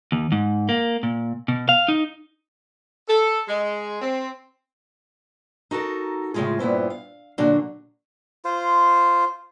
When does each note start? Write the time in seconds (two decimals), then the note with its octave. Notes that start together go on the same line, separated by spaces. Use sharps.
0.12 D#2
0.32 G#2
0.69 A#3
1.03 A#2
1.48 B2
1.69 F5
1.88 D#4
3.09 A4
3.48 G#3
4.01 C4
5.71 D#4 F#4 A4 A#4
6.34 A2 C#3 F#3 G#3 F4 G#4
6.59 G2 A#2 B3 E4 C5
6.90 F5
7.38 A#2 D3 F#3 D4 F#4
8.45 F4 C5